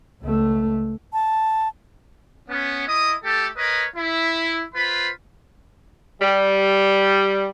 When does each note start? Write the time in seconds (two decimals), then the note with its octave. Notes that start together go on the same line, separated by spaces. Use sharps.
0.22 C#2 A3
1.13 A5
2.49 B3 C#4
2.87 E4 D#5 D#6
3.24 A3 G4 A4
3.57 A#4 B4 C#5 D#5
3.96 E4
4.74 F4 B4 C5 B5
6.22 G3